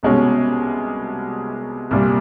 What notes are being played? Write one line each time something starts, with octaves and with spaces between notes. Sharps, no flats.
C2 B2 G#3 C#4
C2 A#2 G3